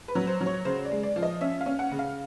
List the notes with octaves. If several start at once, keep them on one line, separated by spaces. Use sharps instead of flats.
B4
F#3
C5
F#3
C#5
C#3 C5
D5
G#3
D5
F3
D#5
C#4 E5
F5
C#4
F#5
C#3
F5